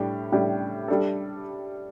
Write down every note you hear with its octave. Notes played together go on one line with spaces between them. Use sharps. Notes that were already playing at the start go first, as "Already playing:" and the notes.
Already playing: A2 G3 D4 G4
A2 G3 D4 G4
G3 D4 A4